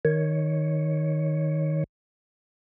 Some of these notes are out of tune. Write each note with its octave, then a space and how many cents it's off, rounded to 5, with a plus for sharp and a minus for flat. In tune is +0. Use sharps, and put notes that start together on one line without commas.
D#3 +0 C#5 +0